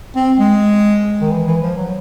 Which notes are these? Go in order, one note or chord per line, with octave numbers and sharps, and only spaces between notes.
C4
G#3
D#3
E3
E3
F3
F#3